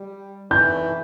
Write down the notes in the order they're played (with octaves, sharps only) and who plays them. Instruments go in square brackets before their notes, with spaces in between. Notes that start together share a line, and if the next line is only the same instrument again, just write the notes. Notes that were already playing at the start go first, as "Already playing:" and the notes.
Already playing: [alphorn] G3
[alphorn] E3 [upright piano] G6